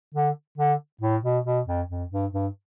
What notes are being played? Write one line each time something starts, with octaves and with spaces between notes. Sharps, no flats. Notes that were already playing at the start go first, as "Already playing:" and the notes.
D3
D3
A2
B2
B2
F2
F2
G2
G2